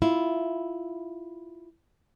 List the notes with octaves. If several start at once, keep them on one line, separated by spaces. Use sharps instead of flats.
E4 F4